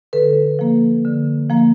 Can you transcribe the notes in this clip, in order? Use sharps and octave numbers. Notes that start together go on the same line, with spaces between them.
D3 A4 B4
F3 A#3
D3
F3 A#3